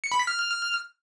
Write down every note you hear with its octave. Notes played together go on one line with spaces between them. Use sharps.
C#7
B5
B6
F6